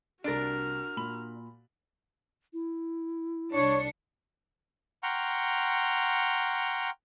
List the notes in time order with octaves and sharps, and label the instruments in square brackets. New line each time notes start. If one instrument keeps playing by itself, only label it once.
[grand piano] C2 A6 D7 [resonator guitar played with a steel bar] D4 A#4 [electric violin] F#4 F6
[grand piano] A#2 B5 F#7
[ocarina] E4
[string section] C2 D4 C#7 [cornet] C#5
[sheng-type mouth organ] F#5 G5 A#5 C6 C#6 F6